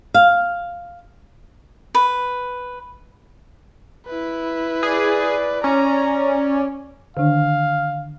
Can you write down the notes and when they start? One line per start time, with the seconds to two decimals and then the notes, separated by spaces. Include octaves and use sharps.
0.14 F5
1.95 B4
4.07 E4 B4
4.83 G#4 D5
5.64 C#4 A#5
7.17 D3 D#3 D4 F5